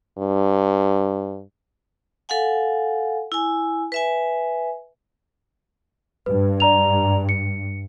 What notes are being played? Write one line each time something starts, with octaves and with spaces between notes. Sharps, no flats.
G2
A4 F5 F#5 G#5
E4 G#5
B4 E5 G#5
G2 B4
D5 A#5 F7
C#7